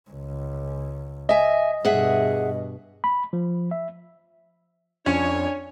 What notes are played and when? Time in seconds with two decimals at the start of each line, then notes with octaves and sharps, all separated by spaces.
0.11 C#2
1.29 D#5 E5 G#5
1.85 G2 B2 G#4 E5 F#5
3.04 B5
3.33 F3
3.71 E5
5.06 F2 C#4 D4 C#5 G#5